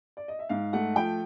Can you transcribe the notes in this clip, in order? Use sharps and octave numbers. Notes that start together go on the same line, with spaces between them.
D5
D#5
E5
G#2 F5
A3 F#5
F3 G5